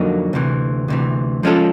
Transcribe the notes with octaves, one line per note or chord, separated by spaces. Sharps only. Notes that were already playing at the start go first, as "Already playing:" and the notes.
Already playing: F2 D3 F#3 A#3 D#4
D2 C3 E3
D2 C3 E3
F3 G#3 C#4 F4 A4